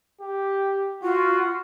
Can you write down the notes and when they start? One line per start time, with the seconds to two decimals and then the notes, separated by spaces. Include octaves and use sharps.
0.21 G4
1.03 F4 F#4